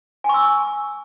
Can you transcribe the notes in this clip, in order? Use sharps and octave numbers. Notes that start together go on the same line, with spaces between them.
G#5 C#6 E6